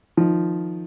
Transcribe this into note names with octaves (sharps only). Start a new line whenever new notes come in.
D#3 F3